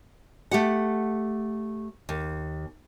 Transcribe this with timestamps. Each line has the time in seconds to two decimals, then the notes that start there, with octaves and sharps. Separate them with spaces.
0.51 A3 G4 F#5
2.09 D#2